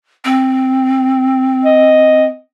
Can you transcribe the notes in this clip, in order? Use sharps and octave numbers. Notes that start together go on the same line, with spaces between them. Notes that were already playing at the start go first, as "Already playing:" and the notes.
C4
D#5